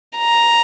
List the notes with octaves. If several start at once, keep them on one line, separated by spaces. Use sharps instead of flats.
A#5